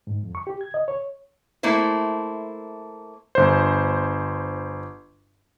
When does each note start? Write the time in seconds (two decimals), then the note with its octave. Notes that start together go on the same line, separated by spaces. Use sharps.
0.07 G#2
0.23 F2
0.35 C#6
0.47 G4
0.61 G#6
0.74 D#5
0.88 C#5
1.63 A3 A#3 E4 C5
3.35 G1 C5